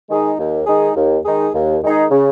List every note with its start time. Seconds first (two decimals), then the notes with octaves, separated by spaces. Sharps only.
0.09 D#3 G#3 D#4 G#4
0.38 D#2
0.67 D#3 G#3 D#4 G#4
0.96 D#2
1.25 D#3 G#3 D#4 G#4
1.54 D#2
1.83 D#3 G#3 D#4 G#4
2.11 C#3